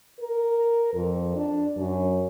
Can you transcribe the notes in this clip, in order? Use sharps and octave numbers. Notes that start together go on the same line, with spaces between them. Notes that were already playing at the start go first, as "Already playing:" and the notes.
A#4
F2
D4
F#2